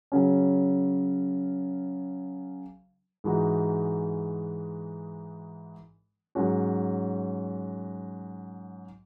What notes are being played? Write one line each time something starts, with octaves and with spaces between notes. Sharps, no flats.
C#3 F#3 C#4
G#2 E3 G#3 D#4 F#4
G#2 F#3 C#4 F#4